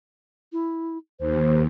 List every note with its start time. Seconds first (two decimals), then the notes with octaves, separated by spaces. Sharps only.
0.52 E4
1.19 D#2 C5